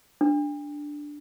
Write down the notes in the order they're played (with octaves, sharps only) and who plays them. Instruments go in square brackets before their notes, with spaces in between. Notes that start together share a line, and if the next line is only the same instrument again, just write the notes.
[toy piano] D4